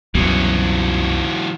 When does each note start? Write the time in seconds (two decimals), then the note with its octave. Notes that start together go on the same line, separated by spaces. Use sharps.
0.15 C2 F#2 B2 E3 F#3